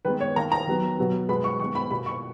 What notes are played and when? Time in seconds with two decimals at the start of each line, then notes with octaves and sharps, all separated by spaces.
0.05 D#3 G#3 B3 B4
0.20 C#5
0.36 D#3 A#3 A#5
0.52 A#5
0.67 D#3 F#3 B3
0.98 B2 F#3 B3
1.29 B2 G#3 B3 B5
1.44 C#6
1.60 D#3 G#3 B3 C#6
1.75 B5
1.91 B2 A#3 B5
2.06 C#6